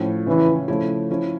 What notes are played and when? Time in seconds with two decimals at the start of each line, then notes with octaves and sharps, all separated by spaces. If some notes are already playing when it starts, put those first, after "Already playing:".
Already playing: A2 F3 C#4
0.27 C#3 E3 F3 C#4
0.68 C#3 F3 A3 E4
1.10 F3 C#4 E4